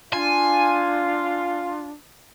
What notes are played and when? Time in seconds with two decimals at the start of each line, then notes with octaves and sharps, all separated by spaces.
0.13 D4 F4 G#5